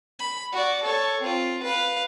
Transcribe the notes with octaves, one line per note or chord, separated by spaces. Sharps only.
B5
F#4 D5
A4 C#5
C4 F4
B4 F5